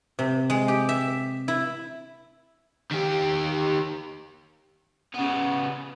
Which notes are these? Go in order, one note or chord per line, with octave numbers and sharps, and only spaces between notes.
C3
G#3
G4
E5
E4
D#3 G4
C#3 B3